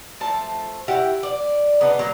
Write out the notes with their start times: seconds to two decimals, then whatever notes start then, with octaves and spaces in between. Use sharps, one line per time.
0.20 F3 A3 A5
0.88 E4 F#4 G4 F#5
1.23 D5
1.81 C#3 B3 D4 D#4
1.99 F#3 A#3 A#4